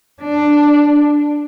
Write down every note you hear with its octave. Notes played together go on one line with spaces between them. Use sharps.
D4